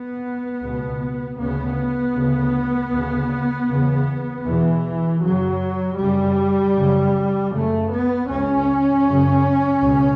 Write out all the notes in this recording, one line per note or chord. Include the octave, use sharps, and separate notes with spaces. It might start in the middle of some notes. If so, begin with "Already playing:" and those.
Already playing: B3
C#2 B2
D2 C#3 B3
D2 C#3
D2 C#3
E2 C#3
E2 B2 E3
F#2 C#3 F#3
F#2 C#3 G3
F#2 C#3
F#2 C#3 A3
B3
C#2 C#3 C#4
F#2 C#3
C#2 B2